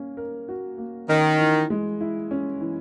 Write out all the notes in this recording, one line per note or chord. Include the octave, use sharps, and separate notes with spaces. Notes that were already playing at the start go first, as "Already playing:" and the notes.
Already playing: A#3 C#4
A#4
F#4
A#3
D#3 C#4
E3
G#3
E4
C#4
E3